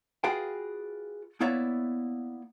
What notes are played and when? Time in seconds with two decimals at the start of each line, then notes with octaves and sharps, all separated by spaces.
0.24 F4 F#4 G#4 B4 F5 G5
1.41 A#3 B3 E4 C#5 D5 E5